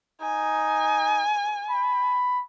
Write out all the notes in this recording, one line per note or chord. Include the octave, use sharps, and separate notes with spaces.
D#4 G#5
B5